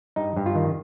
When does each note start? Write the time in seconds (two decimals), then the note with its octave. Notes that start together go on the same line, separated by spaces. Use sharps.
0.16 G2 D#4
0.36 G2
0.46 F4
0.55 D#3